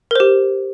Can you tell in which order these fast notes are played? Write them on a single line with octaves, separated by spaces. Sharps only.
A#4 C5 G4